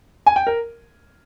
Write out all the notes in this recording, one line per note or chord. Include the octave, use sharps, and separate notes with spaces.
G#5
G5
A#4